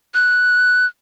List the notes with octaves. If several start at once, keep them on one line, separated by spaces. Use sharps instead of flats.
F#6